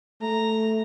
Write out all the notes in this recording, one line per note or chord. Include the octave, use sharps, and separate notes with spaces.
A3 A#5